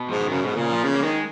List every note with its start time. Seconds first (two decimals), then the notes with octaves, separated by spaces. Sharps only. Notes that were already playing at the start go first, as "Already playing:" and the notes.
Already playing: B2
0.09 G#2 F3
0.20 D#3
0.29 F#2 C#3
0.43 G#2 B2
0.57 A#2 C#3
0.70 F3
0.84 C#3
0.95 A#3
1.03 D#3 G#3